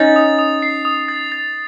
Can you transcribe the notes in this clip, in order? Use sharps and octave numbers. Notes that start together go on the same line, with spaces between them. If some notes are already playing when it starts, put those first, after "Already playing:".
Already playing: C#4 D#4 A6
D#6
D#6
C7
D#6
A6
A6